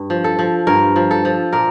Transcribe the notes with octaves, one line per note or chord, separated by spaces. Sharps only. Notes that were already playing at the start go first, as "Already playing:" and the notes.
Already playing: G2
F3
A4
F3
G2 A#4
F3
A4
F3
A#2 A#4